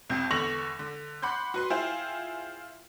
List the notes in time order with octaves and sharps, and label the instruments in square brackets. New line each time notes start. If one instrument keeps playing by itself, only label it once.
[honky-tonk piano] C2 F2 C4 G6
E2 D3 C#6 A#6 F7 F#7
D3
F#5 B5 C6 D6 G6
F#4 B4 C6
E4 F4 G#4 C5 G5